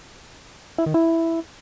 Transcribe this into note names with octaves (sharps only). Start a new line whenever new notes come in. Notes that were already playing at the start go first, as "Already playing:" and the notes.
E4
D#3
E4